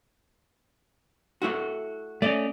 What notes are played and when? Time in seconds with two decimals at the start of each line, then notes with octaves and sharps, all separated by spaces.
1.42 A3 E4 F#4
2.22 A3 C#4 D5 D#5